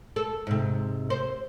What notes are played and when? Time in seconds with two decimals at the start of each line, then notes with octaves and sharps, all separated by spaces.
0.16 A4
0.47 G#2 C3
1.10 C5